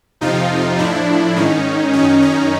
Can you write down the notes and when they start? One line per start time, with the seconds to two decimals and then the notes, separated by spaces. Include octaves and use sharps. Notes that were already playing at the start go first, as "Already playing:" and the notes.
0.21 F2 C3 F3 D#4 F4
0.78 A2 F3 D4 E4
1.36 G#2 D#3 C#4 D#4
1.93 F#2 D#3 C#4 D#4
2.22 C#4 D#4